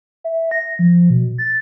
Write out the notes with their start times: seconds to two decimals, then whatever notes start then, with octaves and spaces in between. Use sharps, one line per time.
0.24 E5
0.51 A#6
0.79 F3
1.10 B2
1.38 A6